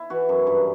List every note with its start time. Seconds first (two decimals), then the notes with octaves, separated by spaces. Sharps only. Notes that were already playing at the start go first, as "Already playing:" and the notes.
Already playing: E4
0.10 E3 F#4
0.29 F#2
0.47 G2